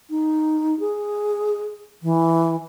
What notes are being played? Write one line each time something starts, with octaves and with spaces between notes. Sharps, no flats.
D#4
G#4
E3